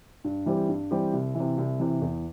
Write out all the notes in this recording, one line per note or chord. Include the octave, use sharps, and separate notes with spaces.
G2
E3 G3 C4 G4
G2
E3 G3 C4 G4
C2
E3
C3
C2
C3 E3
E2